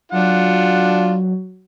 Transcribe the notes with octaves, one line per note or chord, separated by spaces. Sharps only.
F#3 D4 F4 F#5